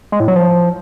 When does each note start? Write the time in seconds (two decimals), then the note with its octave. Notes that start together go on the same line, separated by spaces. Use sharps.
0.12 G#3
0.20 A2
0.28 F#3
0.36 F3